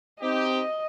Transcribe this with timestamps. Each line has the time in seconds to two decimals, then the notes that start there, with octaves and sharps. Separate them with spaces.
0.22 C4 D#4 G4 D#5